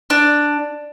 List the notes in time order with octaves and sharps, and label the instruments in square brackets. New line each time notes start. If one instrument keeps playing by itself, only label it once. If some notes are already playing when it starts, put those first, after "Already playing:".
[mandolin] D4